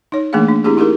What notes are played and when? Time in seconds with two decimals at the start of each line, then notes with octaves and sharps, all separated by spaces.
0.12 D#4 C#5
0.33 E3 A3 A#3 D4 G#4 F5
0.49 D4
0.64 C4 D4 E4 G4 G#4
0.77 D#4 E4 G4 G#4 A#4